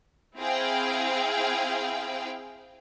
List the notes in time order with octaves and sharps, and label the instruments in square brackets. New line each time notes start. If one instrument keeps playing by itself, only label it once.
[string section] C4 E4 G#4 F5 G5